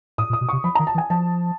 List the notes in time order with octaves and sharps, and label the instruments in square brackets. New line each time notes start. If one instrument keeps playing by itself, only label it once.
[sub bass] A2 [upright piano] D#6
[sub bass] A#2
[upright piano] D#6
[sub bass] B2
[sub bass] C3 [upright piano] C#6
[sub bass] F3 [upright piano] B5
[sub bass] D#3 [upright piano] A#5
[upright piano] A5
[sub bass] E3
[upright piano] G#5
[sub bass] F3 [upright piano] A5